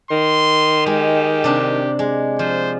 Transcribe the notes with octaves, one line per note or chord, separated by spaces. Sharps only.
D#3 C6
G#3 G4
C3 D4
G#3
F3 C5